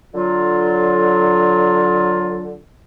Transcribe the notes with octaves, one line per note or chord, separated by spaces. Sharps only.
D3 F#3 F4